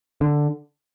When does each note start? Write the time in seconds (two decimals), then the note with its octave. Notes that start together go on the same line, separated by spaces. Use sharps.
0.21 D3